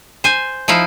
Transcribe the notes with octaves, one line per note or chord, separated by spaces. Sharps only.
C5 G#5
F3 D#4 E4 F5